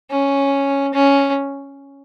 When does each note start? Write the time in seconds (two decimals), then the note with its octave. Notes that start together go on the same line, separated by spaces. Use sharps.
0.10 C#4
0.94 C#4